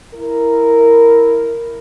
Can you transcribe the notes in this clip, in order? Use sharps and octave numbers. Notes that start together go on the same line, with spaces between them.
E4 A#4